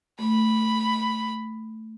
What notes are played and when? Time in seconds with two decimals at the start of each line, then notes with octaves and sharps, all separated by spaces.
0.19 A3 B5